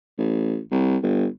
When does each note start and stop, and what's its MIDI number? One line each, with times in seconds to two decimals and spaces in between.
0.18 0.60 33
0.71 0.97 36
1.03 1.26 31